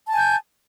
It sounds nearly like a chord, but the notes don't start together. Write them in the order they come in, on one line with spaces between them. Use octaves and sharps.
A5 G#5 G6